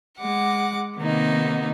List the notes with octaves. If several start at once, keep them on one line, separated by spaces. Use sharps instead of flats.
G#3 F#5 D6
C3 D#3 A#3 B3 D#4